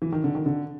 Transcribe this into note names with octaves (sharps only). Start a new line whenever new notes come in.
E3
D#3
D3
D#3
D3